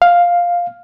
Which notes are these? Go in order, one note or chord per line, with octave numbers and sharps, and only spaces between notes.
F5